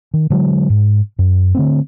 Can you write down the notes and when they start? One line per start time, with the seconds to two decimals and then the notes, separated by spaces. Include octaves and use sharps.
0.14 D#3
0.30 D3 F#3 G#3
0.70 G#2
1.19 F#2
1.55 D3 A3 C4